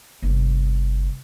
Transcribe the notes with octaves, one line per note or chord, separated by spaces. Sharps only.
G1 C3